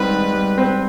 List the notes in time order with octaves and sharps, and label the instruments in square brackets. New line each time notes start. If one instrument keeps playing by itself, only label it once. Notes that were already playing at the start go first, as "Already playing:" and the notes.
Already playing: [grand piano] G#2 G3 C4 [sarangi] B4
[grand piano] D#3
G3
C4